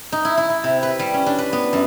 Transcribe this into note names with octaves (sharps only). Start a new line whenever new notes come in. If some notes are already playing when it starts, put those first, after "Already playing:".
D#4
E4
E4
E4
C3
B4
G3
C#4
D4
B4
B3
F#2